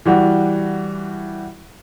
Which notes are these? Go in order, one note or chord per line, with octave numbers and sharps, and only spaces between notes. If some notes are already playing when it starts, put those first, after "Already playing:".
E3 G3 F#4 F#5